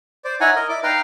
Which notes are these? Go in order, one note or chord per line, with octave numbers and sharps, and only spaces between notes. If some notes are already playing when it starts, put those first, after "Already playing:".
C5 D5
D#4 E4 C#5 F#5 G#5 A#5
A#4 D#5
E4 D5 D6
D#4 B4 F5 G5 A#5 C6